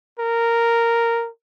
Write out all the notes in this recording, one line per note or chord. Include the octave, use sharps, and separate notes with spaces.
A#4